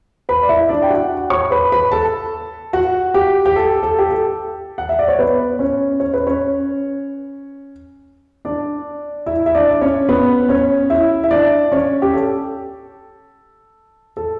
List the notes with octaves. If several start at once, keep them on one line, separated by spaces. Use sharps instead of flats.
B4 B5
D5
E4 E5
D4 D5
G5
F#4 F#5
C#5 C#6
B4 B5
B4 B5
A4 A5
F#4 F#5
G4
G4
A4
A4
G4
A4
F#5
E5
D5
C#5
B3 B4
C#4 C#5
C#5
B4
C#4 C#5
D4 D5
E4 E5
E5
D4 D5
D5
C#4 C#5
B3 B4
C#4 C#5
E4 E5
E5
D4 D5
C#4 C#5
G4
A4
A4